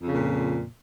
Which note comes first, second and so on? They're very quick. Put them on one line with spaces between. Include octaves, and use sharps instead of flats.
F2 C#3 A#2